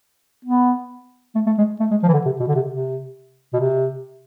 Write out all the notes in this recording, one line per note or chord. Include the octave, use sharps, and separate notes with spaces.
B3
A3
A3
G#3
A3
G#3
F3
E3
D3
C3
B2
D3
C3
C3
B2
C3